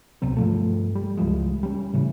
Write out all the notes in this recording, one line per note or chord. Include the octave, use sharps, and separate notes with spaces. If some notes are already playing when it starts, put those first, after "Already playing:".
C#2 B2 F#3 C4
G2 F3 A3
G3
C#2 E3 F3 G#3
G3 C#4
A2 C#3 E3